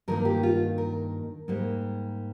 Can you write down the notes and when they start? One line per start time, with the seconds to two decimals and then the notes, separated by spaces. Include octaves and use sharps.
0.08 G2 D#3 A#3 A#4
0.25 G4
0.43 F4
0.78 A#4
1.48 G#2 G3 A#3